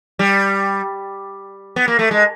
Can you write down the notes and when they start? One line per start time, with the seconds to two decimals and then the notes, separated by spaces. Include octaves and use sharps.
0.19 G3
1.76 B3
1.88 A#3
1.99 A3
2.11 G#3